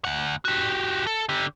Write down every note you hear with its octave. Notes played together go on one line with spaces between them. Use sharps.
D2 F#5
F#4 G4
A4
D3 G4